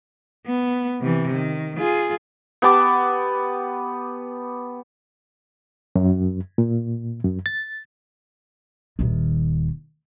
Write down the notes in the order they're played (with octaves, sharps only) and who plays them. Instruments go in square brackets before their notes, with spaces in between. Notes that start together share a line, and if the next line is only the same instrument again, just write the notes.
[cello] B3
C3 E3
D#3
F4 G#4
[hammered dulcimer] B3 G4 A5 D6
[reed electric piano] F#2
A#2
F#2
A6
[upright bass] D#1 D#3